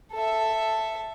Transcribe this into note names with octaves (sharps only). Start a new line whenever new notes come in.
A4 E5